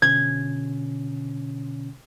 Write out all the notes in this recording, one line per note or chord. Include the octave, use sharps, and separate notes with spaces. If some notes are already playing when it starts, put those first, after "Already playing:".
B2 D3 C#4 G#6